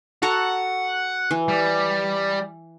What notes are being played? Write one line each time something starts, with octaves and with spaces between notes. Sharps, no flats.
F#4 A4 F#5 A#5
E3
G3